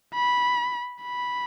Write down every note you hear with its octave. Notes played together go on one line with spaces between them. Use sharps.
B5
B5